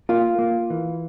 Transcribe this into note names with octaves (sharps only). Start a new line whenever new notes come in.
A#3 F4
A#3
E3